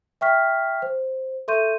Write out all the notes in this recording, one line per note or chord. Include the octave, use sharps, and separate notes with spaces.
E5 G5 C#6 F6 B6
C5
A4 E5 C6 C#6 G6 D#7